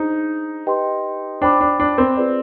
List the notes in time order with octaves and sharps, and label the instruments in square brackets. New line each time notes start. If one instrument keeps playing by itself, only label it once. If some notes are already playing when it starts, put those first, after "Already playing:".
Already playing: [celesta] D4 G#4 C5 [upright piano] D#4
[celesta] G4 B4 D#5 G5 C6
[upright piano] D4 [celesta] C5 G5 B5 D6
[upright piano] D4
D4
C4
[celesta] F4 G#4 B4 D5